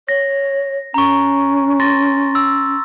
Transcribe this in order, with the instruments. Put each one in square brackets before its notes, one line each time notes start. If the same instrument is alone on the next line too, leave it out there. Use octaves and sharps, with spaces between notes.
[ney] C#5 [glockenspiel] A#6
[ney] C#4 [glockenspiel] A#5 C#6
[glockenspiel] C6 A6 A#6
E6